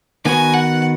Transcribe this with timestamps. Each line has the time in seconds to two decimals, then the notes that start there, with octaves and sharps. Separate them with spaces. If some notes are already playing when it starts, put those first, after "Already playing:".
0.25 D#3 B3 F#4 B4 G#5
0.54 F#5